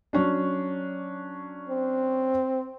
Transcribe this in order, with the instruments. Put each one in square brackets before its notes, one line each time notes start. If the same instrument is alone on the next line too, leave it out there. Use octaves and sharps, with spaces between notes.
[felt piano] F#3 C#4 D4
[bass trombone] C4